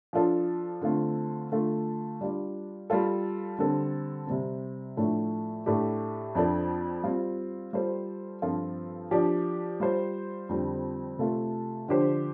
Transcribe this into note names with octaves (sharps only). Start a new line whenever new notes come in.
F3 D4 F4 A4
D3 A3 C4 F4
D3 A3 F4 A4
G3 D4 F4 D5
G3 F4 A4
D3 G3 C4 A4
C3 G3 C4
A2 F3 A3 D4
A2 A3 D4 G4
F2 F3 D4 A4
G3 C4 F4
G3 F4 A4 C5
G2 F3 C4 F4 A4
F3 D4 G4 D5
G3 F4 C5
F2 D3 G3 C4
C3 A3 F4 A4
D3 F3 D4 G4 C5